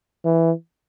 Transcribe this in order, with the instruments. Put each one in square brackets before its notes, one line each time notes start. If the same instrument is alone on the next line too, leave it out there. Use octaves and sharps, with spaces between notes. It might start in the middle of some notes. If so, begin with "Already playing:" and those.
[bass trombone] E3